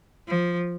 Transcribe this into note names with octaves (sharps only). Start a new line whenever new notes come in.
F3